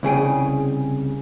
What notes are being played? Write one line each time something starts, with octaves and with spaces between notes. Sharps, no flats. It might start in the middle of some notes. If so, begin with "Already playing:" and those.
C2 C#3 G#4 G5